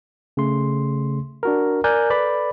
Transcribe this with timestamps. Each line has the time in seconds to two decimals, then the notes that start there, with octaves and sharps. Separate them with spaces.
0.37 C#3 A3 C6
1.43 D4 F#4 A#4
1.84 A#4 D5 G#5 F#6 G6
2.10 A4 B4 D5 B5